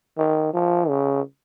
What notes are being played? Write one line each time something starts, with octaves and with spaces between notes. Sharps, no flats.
D#3
F3
C#3